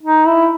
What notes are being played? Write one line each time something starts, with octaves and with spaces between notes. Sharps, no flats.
D#4
E4